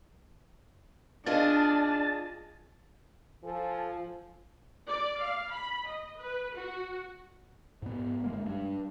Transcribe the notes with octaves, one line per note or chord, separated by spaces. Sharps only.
D4 F4 G#4 D#5 A5
F3 A4 G#5
D5
F5
B5
D#5
B4
F#4
G#2 B3
G1 G#3 A#3
G2